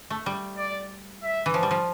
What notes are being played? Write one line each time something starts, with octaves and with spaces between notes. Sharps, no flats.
A3
G3
D5
E5
E3
F3
G3
F3